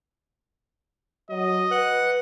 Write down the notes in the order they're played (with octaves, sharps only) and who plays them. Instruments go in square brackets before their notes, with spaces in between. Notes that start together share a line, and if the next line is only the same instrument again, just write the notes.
[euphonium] F#3 [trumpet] D#5
[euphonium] B4 [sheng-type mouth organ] F#5 F#6